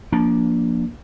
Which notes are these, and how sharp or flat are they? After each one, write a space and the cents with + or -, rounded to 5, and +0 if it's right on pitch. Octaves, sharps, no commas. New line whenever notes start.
F3 +0 A#3 +15 D4 -10